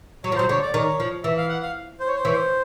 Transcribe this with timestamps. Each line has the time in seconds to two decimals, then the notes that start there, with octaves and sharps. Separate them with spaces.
0.24 F#3 C#5
0.32 F3
0.36 F#3 C5
0.49 D3 C#5
0.62 D5
0.74 D#3 C#5
1.00 F3
1.24 E3 E5
1.37 F5
1.49 F#5
1.62 F5
2.00 C5
2.07 C#5
2.16 C5
2.24 E3 C#5
2.32 C5